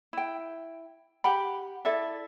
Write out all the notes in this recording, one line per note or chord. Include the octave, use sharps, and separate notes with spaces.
E4 G5
G4 F#5 G5 B5
E4 A4 D5 E5